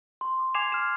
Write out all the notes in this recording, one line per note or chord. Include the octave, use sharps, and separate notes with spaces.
C6
D6
G#5 D6 G#6 C7 E7 F7
F6 E7